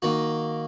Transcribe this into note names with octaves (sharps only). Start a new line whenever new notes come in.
D#3 A#3 F#4